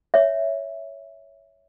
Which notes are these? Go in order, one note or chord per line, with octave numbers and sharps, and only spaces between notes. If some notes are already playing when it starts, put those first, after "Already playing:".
C#5 E5